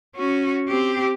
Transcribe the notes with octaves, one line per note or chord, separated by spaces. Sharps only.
C#4 F#4
C4 G4